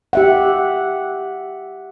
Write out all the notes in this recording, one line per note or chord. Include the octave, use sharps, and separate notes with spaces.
G4 E5 F#5